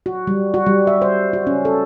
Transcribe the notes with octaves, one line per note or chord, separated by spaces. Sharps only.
F#4
G3
F#4
G3
E5
C5
F#4
C#4
A4